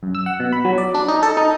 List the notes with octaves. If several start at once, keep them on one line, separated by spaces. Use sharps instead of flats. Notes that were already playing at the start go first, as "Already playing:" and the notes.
F#2
E6
F#5
B2
B5
F#3
D5
D4
D#4
A4
D#4